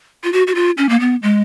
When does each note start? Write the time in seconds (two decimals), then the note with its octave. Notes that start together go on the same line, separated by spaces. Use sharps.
0.24 F4
0.33 F#4
0.47 F#4
0.55 F4
0.78 C#4
0.89 A#3
1.00 B3
1.23 G#3